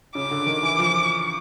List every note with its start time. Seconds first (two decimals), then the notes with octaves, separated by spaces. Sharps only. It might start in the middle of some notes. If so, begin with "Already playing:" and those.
0.15 C#3 D6
0.31 D3
0.46 D#3
0.63 E3
0.78 F3